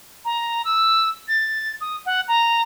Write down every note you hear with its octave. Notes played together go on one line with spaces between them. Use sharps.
A#5
E6
A6
D#6
F#5
A#5